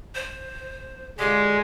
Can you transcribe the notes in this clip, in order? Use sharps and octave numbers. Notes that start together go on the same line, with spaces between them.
C5
D3 G#3 F4 G4